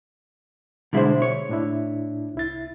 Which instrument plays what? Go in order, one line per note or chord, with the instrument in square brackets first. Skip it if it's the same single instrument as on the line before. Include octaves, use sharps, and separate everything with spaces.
[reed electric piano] B2 F#3 C5 [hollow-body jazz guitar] D3 G#3 E4
[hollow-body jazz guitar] C#5
[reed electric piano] A2 D4 E4
C2 E4 A6